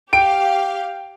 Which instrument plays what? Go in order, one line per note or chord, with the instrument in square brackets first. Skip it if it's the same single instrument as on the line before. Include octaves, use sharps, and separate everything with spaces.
[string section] G4 F5 [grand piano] G5 D7